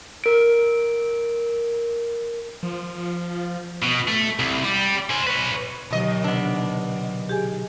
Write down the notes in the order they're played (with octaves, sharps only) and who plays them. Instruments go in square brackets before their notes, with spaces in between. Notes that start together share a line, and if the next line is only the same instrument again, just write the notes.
[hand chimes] A#4 D7
[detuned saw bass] F3
[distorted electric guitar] B2
A3
C2
G3
C5 G#5
B4 C#5
[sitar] D#2 D#5 [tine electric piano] B2 D3 F#3
[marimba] C3 [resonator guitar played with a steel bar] B3 D4
[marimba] G4 G#4 G#5